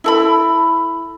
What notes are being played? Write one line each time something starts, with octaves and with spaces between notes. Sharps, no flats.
E4 A4 B5